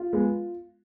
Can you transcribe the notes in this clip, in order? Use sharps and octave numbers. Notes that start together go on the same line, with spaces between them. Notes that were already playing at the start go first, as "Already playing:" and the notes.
Already playing: F4
G#3 B3